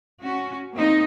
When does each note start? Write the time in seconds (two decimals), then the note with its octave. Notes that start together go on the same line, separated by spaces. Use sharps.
0.21 C#4 F#4
0.73 A#3 C4 D#4